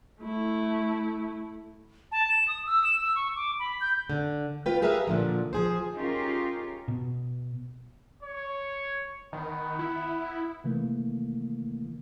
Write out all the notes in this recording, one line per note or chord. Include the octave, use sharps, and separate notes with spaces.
A3 E4
A5
E7
D#6
E6
E7
E6
C#6
D6
B5
G6
D3
F4 B4 G5
G4 G#4 A#4 B4 E5 F5
A#2 D3 F3
F3 G#4 C5
C#4 D#4 F4 G4 G#4 A#4
B2
C#5
D#3 B3
E4
C3 D#3 E3 A3 A#3